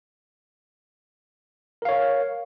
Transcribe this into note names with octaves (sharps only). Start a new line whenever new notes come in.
A#4 C#5 F5